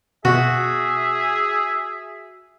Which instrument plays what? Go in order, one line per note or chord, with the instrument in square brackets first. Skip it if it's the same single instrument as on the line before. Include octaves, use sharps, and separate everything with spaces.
[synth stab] B2 [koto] F#4 [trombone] G#4 [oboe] E5